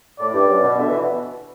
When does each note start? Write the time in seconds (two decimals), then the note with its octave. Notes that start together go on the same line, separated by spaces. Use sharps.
0.19 A2 D5
0.33 G2
0.48 F#2
0.63 B2
0.78 D3 E5
0.88 E3
0.98 B2